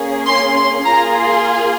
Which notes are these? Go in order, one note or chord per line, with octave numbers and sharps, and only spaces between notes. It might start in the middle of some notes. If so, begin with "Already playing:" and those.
Already playing: A#3 C#4 G#4
C6
C6
A#3 F4 G#4 A#5
C6